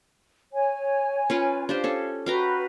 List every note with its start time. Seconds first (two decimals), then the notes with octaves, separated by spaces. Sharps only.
0.53 C#5 G#5
1.30 C#4 F4 B4
1.69 D4 G4 C5 F5
1.84 C#4 A4
2.26 F#4 B4 F5 G5 A#5